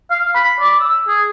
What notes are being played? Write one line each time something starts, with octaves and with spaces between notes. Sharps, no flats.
F5
B5
D5
E6
G#4